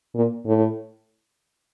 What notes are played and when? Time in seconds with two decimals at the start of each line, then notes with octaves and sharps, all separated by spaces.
0.15 A#2
0.46 A2